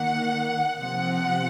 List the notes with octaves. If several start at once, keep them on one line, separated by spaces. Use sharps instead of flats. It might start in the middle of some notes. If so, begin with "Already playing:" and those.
Already playing: D#3 A#3 F#5
C3 F3 C4 F#5